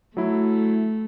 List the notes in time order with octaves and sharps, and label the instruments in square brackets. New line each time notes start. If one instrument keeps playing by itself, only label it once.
[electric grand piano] F#3 E4 [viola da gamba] A3